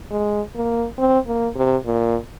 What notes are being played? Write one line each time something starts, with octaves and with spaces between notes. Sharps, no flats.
G#3
A#3
C4
A#3
C3
A#2